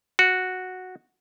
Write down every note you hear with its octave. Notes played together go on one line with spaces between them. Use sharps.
F#4